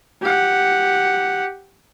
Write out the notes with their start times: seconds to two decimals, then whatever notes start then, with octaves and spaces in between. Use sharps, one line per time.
0.22 G4 F#5